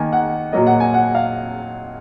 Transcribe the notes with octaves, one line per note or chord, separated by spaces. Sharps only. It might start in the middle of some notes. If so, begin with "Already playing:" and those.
Already playing: D#3 A#3 G#5
F#5
A#2 F#3 A#3 D#5
F#5
G#5
F#5
F5